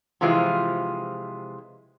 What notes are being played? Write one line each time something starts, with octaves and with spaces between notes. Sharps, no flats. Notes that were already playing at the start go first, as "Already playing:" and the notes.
C3 E3 F3 G#3 F4